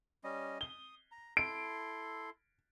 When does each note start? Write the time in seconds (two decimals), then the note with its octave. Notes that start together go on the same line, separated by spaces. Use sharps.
0.24 G3 C#4 D#5
0.61 D#6 G7
1.12 A#5
1.37 E4 A4 C6 D7